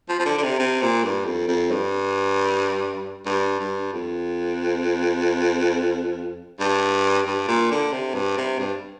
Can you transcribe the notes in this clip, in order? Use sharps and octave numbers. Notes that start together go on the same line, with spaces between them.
F3
F3
D3
D3
C3
C3
A#2
G2
F2
F2
G2
G2
G2
F2
G2
G2
A#2
D3
C3
G2
C3
G2